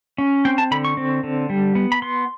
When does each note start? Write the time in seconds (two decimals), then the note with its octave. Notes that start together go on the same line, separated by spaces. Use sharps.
0.18 C#4
0.45 C4 G5
0.58 A5
0.71 D3 B5
0.85 C#6
0.97 C4
1.23 D3
1.50 G3
1.75 B3
1.92 B5
2.02 B3 C6